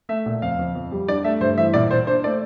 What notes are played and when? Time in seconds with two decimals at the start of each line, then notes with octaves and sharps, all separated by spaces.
0.09 A3 E5
0.26 A#2
0.42 F2 F5
0.59 F2
0.75 F2
0.92 G3
1.08 D4 D5
1.24 A3 E5
1.41 G2 C5
1.57 E3 E5
1.74 A#2 D5
1.91 A#2 C5
2.07 D4 C5
2.24 A3 D5